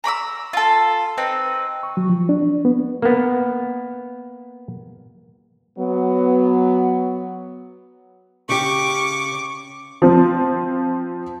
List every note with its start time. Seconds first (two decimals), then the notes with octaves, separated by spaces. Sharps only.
0.04 A#5 B5 D6 E6
0.53 F4 A4
1.18 C4 D#4 B4
1.83 C#6
1.97 F#3
2.10 F3
2.29 D4
2.42 D4
2.65 B3
3.02 A#3 B3
5.78 F#3 B3
8.49 C#3 G4 C#6 D6
10.02 F3 C4